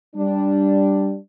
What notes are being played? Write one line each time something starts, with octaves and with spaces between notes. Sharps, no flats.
G3 D4